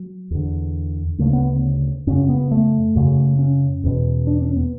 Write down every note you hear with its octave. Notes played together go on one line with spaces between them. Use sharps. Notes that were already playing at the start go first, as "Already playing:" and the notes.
Already playing: F#3
E2 D3
D2 C#3 A3
B3
F#2 C#3 C#4
B3
A3
F#2 C#3
C#4
E2 B2
D4
C#4
B3